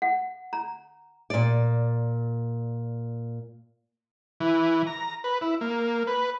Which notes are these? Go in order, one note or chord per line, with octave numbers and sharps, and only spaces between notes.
F#5
A#5
A#2 D5
E3
A#5
B4
E4
A#3
B4